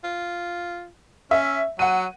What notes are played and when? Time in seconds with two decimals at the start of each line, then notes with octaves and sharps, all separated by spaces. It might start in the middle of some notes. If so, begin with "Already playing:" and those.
0.04 F4
1.31 C#4 E5
1.79 F#3 F#5 D#7